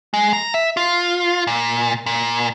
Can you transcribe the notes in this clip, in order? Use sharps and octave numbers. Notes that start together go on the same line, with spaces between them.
G#3
A#5
E5
F4
A#2
A#2